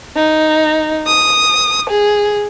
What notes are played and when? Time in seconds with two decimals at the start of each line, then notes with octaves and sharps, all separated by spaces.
0.16 D#4
1.07 D#6
1.90 G#4